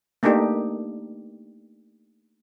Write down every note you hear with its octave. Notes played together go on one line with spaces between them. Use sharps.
A3 A#3 D4 D#4 G4